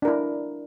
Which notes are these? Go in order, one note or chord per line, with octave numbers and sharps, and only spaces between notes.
D4 E4 A#4